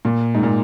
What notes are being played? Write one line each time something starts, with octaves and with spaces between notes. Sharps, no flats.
A#2
G#2
A#2